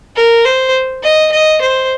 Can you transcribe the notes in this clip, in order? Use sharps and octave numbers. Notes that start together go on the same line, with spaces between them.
A#4
C5
D#5
D#5
C5